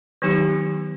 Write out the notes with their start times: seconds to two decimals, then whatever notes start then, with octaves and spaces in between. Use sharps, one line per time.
0.22 D#3 F#3 B3 D#4 G4